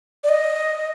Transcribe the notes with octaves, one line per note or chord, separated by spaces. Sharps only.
D5
D#5